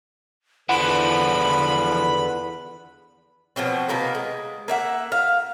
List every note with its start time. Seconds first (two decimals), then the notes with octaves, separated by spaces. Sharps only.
0.69 E2 D3 E3 F3 B4 F#5 B5
3.56 B2 F3 F#3 C4
3.89 C3 D#3 A#3 B3
4.15 G#3
4.68 A#3 E5 F#5
5.12 F5